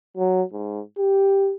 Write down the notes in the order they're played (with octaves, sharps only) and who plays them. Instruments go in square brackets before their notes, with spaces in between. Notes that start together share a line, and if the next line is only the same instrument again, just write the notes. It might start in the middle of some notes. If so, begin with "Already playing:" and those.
[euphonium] F#3
G#2
G4